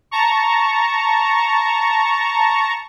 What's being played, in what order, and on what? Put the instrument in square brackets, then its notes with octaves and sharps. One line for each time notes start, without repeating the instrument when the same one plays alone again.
[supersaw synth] A5 A#5 C#6